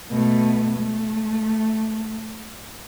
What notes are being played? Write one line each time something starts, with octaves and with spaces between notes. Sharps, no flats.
B2 A3
A3